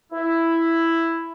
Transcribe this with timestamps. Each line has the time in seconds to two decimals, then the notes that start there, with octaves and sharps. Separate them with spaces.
0.12 E4